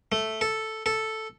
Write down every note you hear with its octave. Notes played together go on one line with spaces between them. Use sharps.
A3
A4
A4